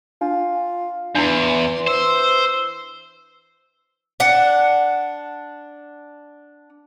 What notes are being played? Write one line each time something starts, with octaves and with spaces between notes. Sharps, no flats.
D4 F4
E2 E3 D4 E4 C6
C5 E6
D4 F#5